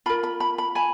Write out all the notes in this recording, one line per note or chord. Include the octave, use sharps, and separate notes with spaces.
F4 A#4 B5
B5
B5
B5
G#5 B5